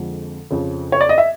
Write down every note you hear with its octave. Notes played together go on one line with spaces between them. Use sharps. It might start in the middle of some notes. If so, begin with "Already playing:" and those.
Already playing: F2 D3 F3 G#3
F2 C#3 F3
C#5
D5
D#5
E5